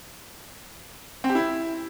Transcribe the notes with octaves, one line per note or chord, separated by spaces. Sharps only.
C4
G4
E4